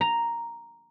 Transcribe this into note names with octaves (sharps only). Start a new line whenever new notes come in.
A#5